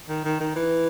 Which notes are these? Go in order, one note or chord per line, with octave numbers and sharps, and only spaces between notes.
D#3
D#3
D#3
E3